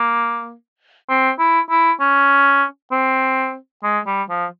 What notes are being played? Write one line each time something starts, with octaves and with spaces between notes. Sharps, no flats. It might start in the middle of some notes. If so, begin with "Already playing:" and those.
Already playing: A#3
C4
E4
E4
C#4
C4
G#3
G3
F3